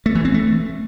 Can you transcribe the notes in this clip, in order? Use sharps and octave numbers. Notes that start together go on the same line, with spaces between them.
A3
E3
C4
A3